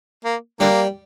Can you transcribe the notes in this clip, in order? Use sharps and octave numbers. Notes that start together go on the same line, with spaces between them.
A#3
D3 G3 A#3